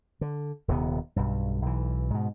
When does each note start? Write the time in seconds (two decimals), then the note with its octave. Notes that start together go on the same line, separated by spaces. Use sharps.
0.21 D3
0.68 D#1 D#2 C3 B3
1.16 B1 G2
1.62 B1 E3
2.10 G#2 B2